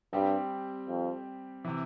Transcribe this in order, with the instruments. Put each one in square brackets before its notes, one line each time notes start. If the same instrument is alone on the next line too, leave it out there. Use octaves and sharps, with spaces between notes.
[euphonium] G2 [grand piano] G3 C4 G4
[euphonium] F2
[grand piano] C3 E3